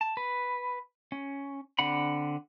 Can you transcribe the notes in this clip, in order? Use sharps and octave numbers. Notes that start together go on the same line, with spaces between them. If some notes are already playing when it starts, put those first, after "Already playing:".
A5
B4
C#4
D3 C4 D4 F#5 B5